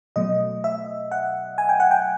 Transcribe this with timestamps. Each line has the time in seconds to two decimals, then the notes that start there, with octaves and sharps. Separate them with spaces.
0.16 B2 F#3 A3 D#5
0.64 E5
1.12 F#5
1.58 G#5
1.69 G5
1.80 F#5
1.91 G5